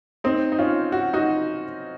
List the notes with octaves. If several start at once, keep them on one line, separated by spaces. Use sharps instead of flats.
C4 D#4
D#4
C#4 F4
F#4
D#4 F#4